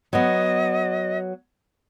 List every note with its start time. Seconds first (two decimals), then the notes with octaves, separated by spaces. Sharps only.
0.13 F#3 B3 D#5